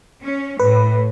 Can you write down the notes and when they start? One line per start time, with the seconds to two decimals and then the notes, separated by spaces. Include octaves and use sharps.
0.23 C#4
0.60 A2 B4